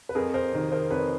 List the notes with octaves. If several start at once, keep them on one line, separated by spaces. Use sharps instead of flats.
B4
F2 G#4 A#4
A#4 C5
C3 D#3
A#4 C5
F2 B4 C#5